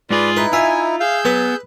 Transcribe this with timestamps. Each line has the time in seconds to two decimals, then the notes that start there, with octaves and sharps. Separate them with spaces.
0.10 G#2 F4 G#4 B4 D5
0.37 D#4 E4 B4
0.53 F4 E5 G#5
1.00 G#4 F5 E6 G6
1.25 F#3 B3 B4